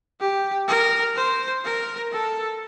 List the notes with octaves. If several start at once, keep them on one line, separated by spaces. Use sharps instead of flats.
G4
A#4
C5
A#4
A4